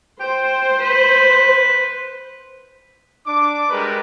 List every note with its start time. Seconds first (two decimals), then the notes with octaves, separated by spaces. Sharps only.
0.20 C5 G5
0.80 B4
3.27 D4 D6
3.70 G3 G#3 A#4 B4